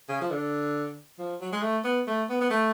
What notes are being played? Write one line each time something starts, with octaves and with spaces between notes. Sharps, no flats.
C#3
F3
D3
F3
F#3
G#3
A3
B3
A3
B3
B3
A3